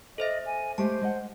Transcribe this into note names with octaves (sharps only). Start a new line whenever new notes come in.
A4 C5 D#5 E5
G#5
G#3 A3 G4 C5 A5
G#3 D#5 F#5